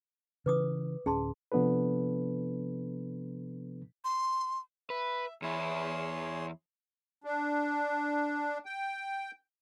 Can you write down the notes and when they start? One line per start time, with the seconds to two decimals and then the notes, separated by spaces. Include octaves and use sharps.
0.46 C#3 E3 B4 D6 D#6
1.06 D1 C#4 G#4 A5 C6
1.52 C3 F3 B3 D4 A4 B4
4.04 C6
4.90 B4 E5
5.42 E2 E4 G#4 C#5 C6
7.24 D4
8.65 G5